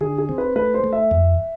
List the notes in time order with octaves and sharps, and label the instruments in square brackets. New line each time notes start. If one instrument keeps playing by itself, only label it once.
[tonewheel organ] D3 [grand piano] G#4
[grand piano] G#4
[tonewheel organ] C4
[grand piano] B4
[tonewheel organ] A3 [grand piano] B4
[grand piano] C5
[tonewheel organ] A3
[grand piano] E5
[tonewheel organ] F2